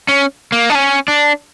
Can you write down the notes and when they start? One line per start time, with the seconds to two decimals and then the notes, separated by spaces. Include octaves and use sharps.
0.08 C#4
0.52 A#3
0.70 D4
0.75 C#4
1.08 D4